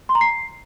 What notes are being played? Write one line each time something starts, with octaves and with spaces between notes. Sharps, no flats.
C6
A#5
C7